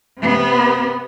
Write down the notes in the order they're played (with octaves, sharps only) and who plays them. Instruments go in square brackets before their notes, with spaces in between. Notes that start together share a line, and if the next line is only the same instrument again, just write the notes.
[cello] C3 B3